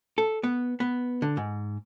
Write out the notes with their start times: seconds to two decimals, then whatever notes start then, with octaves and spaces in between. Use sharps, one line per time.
0.18 A4
0.43 B3
0.80 B3
1.22 D3
1.37 G#2